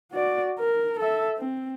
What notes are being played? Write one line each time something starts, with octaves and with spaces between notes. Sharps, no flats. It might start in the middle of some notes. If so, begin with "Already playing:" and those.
F#4 D5
A#4
A4 E5
C4